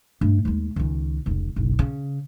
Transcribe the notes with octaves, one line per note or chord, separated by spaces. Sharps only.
G2 A3
D#2 G#3
C#2 D#3
F1 C#2
F#1 B1
C#3